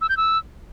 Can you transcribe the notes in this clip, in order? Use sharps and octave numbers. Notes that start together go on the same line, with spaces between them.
E6
G6
E6